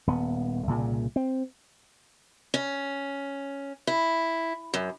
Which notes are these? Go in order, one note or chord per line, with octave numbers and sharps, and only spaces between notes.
D#1 B3
C2 A#2 C#3
C4
C#4
E4
F#2